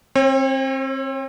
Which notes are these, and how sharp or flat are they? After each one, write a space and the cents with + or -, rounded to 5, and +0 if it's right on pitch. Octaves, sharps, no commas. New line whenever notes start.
C4 +30 C#5 -35